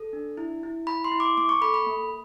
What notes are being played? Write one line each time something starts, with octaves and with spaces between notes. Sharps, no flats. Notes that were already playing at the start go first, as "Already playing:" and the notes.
Already playing: A4
D4
E4
E4
E4 B5
C6
E4
D6
A#3 D6
C#6
A4 B5
B5
A#3